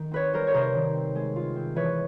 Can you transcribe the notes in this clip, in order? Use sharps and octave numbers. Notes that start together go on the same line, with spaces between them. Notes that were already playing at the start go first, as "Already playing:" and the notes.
Already playing: D#3
C4 B4 C#5
G3 A#4 C5
C#5
C3 A#4 C5
D#3
C4
G#3
F4
C4
E3 B4 C#5